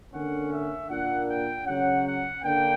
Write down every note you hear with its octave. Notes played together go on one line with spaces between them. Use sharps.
D3 A#3 C#4 F#5
E5
A#2 A#3 D4 F#5
G5
C#3 F#3 C#4 F#5
F#5
D3 A#3 D4 G5